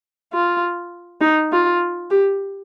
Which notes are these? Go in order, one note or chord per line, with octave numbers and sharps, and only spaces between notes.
F4
D#4
F4
G4